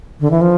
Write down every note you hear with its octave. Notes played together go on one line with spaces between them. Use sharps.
D3
E3
F3